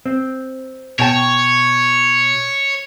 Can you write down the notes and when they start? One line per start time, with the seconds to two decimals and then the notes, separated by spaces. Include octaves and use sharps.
0.06 C4
0.99 B2 C#5 G5 A5